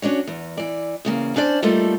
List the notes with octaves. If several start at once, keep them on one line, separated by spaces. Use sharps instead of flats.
C#4 D4 F#4 C#5
E2
E3 D5
E2 C#3 A#3
C#4 D4 C5 D5
G3 A3 A#3 D#4 F4 A4